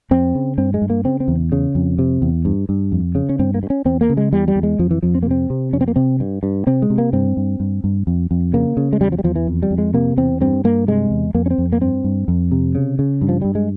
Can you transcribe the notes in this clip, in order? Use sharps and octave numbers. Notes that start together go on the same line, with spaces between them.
F2 C4
C#3
G2 C4
G#3
G2
A#3
C#3 C4
C4
E2
C#3
F2
C3
E2
G2
G2
F2
C#3
C#4
G2 C4
A#3
G2
C#4
E2 C4
A#3
C#3
G#3
E2 G3
G3
E2
G#3
F2 F3
E3
F2 F3
C4
A#3
C3 C4
C3
F2 C#4
C4
A#3
C3 C4
G2
G2
C3 C4
G#3
C3
A#3
G2 C4
G2
G2
G2
F2
F2
C#3 A#3
C#3
G#3
E2 G3
F3
G3
E2 F3
E3
F2
G3
F2
G#3
C3 A#3
E2 C4
G2 C4
G2 A#3
C3 G#3
E2
F2 A#3
C#4
C4
F2
A#3
G2 C4
G2
F2
C3
C#3
C#3
G2
F3
G2 G3
G#3